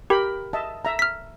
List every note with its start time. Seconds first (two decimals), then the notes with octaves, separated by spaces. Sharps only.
0.10 G4 A#4 G5 B5
0.53 D#5 E5 A5
0.85 E5 A#5
0.99 F6 B6